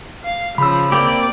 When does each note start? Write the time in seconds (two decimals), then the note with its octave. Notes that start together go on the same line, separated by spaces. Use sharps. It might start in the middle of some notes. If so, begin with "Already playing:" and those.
0.24 F5
0.58 C#3 F3 B5 E6
0.92 A#3 C4 G4 D5